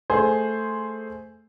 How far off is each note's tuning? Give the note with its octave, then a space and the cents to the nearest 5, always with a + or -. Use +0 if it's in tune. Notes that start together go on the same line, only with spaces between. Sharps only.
A3 +0 G#4 +5 C5 +0